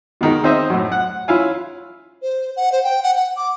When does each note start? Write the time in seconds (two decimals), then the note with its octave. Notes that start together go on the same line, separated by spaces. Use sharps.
0.21 B2 D#3 G#3
0.44 C4 D#4 C5 D#5 E5
0.70 F#2 A2
0.92 F#5
1.28 C#4 E4 F4 F5 G#5
2.22 C5
2.57 F#5
2.72 C5
2.84 G5
3.03 F#5
3.16 F#5
3.36 D6